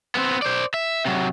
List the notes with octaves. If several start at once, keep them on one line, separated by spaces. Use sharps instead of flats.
B3 C4
C5 D5
E5
C3 F#3